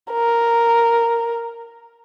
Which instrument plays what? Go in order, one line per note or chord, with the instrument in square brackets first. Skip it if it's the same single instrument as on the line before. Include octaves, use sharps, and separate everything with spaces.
[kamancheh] A#4